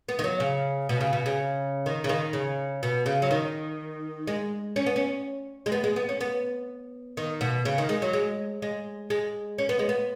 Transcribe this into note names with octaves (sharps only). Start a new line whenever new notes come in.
B3
D#3
F#3
C#3
B2
C#3
B2
C#3
D#3
C#3
D#3
C#3
B2
C#3
F#3
D#3
G#3
C#4
B3
C#4
G#3
B3
G#3
B3
C#4
B3
D#3
B2
C#3
D#3
G#3
F#3
G#3
G#3
G#3
C#4
B3
G#3
B3